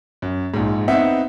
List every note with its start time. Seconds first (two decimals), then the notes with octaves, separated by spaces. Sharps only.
0.22 F#2
0.54 A#1 G#2
0.88 B3 C4 D#4 E5 F#5